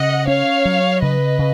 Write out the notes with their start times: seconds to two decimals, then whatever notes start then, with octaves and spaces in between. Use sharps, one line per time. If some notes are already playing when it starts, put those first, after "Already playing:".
Already playing: C#3 D#5 F#5
0.27 C#4 C#5 F5
0.65 F#3
1.01 C#3 B4 D#5
1.39 C#3